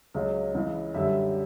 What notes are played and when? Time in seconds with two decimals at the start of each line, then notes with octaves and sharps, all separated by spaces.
0.14 C#2 C#3 F#3
0.54 C#2 C#3 E3
0.94 F#2 D3 G3 E5